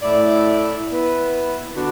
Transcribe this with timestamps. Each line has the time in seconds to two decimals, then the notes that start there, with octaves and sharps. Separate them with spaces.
0.02 A2 A3 E4 D5
0.88 B3 E4 B4
1.73 D3 B3 D4 F#4